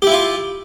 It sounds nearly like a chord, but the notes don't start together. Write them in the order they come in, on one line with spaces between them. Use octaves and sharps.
G4 E4 F4